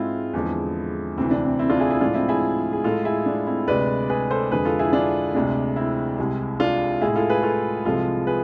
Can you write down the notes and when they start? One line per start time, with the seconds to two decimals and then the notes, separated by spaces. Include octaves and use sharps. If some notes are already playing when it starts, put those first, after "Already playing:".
Already playing: G#2 G#3 C4 E4 F4
0.33 E2 D3 F3 G#3
1.17 D2 C3 E3 C4
1.31 D4
1.45 C4
1.59 C4 E4
1.69 D4 F4
1.80 E4 G#4
1.90 E4 G#4
2.00 A2 F3 G#3 D4 F4
2.14 C4 E4
2.29 E4 G#4
2.73 G#4
2.84 A2 G#3 F4 A4
3.05 E4 G#4
3.26 D4
3.47 C4 E4
3.67 D2 C3 G#3 B4 D5
4.09 G#4 B4
4.30 A4 C5
4.51 F2 D3 G#3 G#4 B4
4.65 F4 A4
4.79 E4 G#4
4.93 D4 F4
5.34 D2 C3 G#3 D4
5.76 C4 E4
6.18 C2 C3 G#3
6.60 D4 F4
7.01 A2 G#3 E4 G#4
7.16 F4 A4
7.29 G#4 B4
7.43 F4 A4
7.85 C2 C3 F3 G#3 F4 A4
8.27 G#4 B4